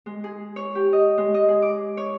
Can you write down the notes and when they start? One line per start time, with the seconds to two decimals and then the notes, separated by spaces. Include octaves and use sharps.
0.06 G#3
0.24 G#4
0.56 C#5
0.75 G4
0.93 D#5
1.18 G#3
1.34 D#5
1.49 G#4
1.62 D6
1.97 C#5